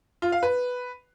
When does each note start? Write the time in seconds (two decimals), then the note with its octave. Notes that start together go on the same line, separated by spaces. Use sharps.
0.22 F4
0.32 F5
0.43 B4